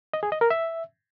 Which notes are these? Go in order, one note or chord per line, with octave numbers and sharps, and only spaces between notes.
D#5
G#4
D#5
A#4
E5